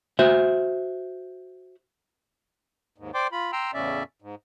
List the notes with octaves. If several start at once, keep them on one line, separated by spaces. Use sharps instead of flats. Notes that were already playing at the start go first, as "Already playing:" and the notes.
F#4 C5 E5
D#2 G#2
C5 D5 G5 C6 D6
F4 B5
G5 A#5 C6 E6
E2 A2 C#3 C#4 D5 E5
G#2